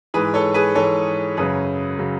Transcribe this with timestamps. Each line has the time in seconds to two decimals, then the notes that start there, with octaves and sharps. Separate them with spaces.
0.14 G#2 E3 G#4 B4
0.34 A4 C#5
0.54 G#4 B4
0.75 G#2 E3 A4 C#5
1.37 F#2 C#3 F#3 G#4 B4
1.99 C#3 F#3